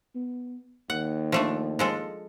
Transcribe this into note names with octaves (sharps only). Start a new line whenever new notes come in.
B3
D#2 F#5
F3 A3 D4
F3 G#3 A4